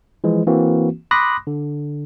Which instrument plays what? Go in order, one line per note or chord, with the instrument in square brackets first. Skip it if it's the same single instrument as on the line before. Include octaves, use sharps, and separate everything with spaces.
[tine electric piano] E3 F3 G#3
E3 A#3 C4 F#4
B5 C6 D6 D#6 F#6 A#6
D3